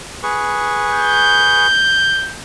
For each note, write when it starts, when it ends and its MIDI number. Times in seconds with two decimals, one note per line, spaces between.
0.23 1.67 68
0.23 1.67 71
0.23 1.67 85
0.94 2.36 91